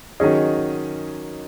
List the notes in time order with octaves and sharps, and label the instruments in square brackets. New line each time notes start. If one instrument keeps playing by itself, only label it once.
[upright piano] D#3 F#3 C#4 G#4 D#5